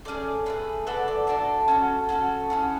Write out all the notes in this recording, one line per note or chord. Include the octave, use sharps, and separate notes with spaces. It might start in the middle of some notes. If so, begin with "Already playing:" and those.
A3 C#4 G#4 D5
A3 C#4 G#4 B4
A3 D4 F#4 A4 B4
D5
A3 D4 F#4 A4 A5
C#4 F#4 A4
C#4 F#4 A4
C#4 E4 G#4 F#5